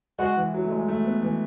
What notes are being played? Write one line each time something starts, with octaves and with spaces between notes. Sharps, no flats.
G#3 F#4
E3
F#3
A3
G#3
A3
B3
E3